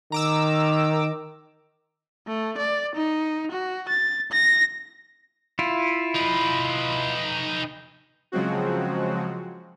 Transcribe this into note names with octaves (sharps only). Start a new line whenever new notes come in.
D#3 A#5 D6 E6
A3
D5
D#4
F#4
A6
A#6
E4 F4
D#4 B4
C#3 F3 F#3 G#3 C4 F#4